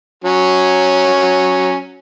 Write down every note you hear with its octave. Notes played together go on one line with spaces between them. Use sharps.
F#3 C#4